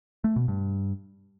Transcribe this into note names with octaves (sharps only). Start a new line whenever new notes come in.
A3
B2
G2